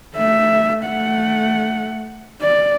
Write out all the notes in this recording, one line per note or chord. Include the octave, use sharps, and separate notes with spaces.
A3 E5
A3 F#5
D5